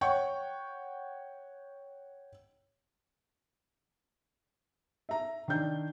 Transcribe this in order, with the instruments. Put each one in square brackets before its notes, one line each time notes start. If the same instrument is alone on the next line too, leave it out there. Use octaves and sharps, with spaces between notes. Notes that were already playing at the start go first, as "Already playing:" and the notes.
[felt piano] C#5 F#5 G5 C#6
E5 A#5
D#3 D4 G6